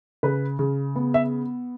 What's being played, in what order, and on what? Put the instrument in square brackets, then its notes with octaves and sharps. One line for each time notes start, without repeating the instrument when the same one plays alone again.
[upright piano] C#3 B4
C#3
B3
E5